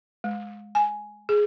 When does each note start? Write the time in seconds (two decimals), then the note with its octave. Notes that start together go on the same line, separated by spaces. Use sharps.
0.24 G#3
0.75 G#5
1.29 G#4